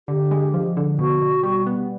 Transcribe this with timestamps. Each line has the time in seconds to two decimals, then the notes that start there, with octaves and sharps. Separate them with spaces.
0.08 D3 G4
0.31 G#3
0.54 F3
0.77 D3
0.99 B2 F#4
1.21 B2
1.43 G3
1.67 B3